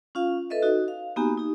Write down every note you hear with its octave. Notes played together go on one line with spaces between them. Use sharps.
C#4 F4 F5
A4 B4 D#5 E5
D#4 F#4
F5
A#3 B3 D#4 F#4 G4 G#5
D#4 G4